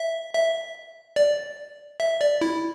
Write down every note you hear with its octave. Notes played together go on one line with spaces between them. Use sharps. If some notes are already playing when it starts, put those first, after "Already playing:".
Already playing: E5
E5
D5
E5
D5
E4